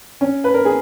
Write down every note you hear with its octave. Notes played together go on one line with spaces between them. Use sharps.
C#4
B4
A#4
G#4